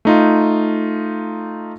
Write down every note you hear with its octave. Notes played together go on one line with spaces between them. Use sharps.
A3 D#4 F4